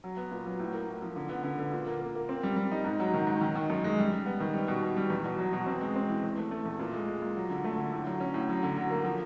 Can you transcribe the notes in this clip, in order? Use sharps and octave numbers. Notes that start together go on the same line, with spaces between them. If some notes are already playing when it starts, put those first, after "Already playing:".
F#3
B3
A#2
F#3
A2
A#3
A2
F3
D3
B3
D3
D3
A#2
A#3
A#3
A#3
C4
G3
G3
D#4
G#2
F#3
D#3
G#2
D#3
D#3
F#2
G#3
G3
G3
B3
D#3
G3
B2
B2
G3
E2
B2
F#3
B2
C4
G#3
C4
E3
E2
A3
A3
E2
A#2
G#3
G#3
A#2
F#3
D3
A3
D3
A2
F#3
C#4
A2
F#3
D3
F#3
A#3
F3